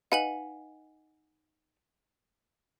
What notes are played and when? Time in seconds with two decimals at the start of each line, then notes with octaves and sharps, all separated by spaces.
0.12 D#4 B4 F5 F#5 G#5 F#7